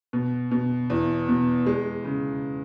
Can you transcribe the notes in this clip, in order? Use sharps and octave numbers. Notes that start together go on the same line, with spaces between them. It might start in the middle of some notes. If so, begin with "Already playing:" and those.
B2
B2
E2
B2
G#3
C#3